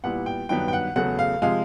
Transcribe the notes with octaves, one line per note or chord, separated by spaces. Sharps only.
A#2 G3 B3 E4 F#5
G5
G2 D#3 F#3 B3 G5
G5
F#5
E2 C#3 F#3 A3 F#5
F5
C3 F3 G#3 F5